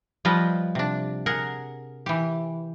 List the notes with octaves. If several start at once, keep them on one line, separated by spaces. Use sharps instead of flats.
F3 G3 F4 B4 D#5
C3 D4
G#4 A#4 F#5
E3 G4